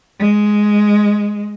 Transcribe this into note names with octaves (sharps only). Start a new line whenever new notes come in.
G#3